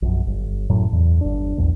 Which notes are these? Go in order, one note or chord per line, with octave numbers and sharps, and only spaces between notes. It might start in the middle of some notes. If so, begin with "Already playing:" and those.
A#1 F#2
G1
F#2 A2 F#3
E2
G1 D4
A#1 E2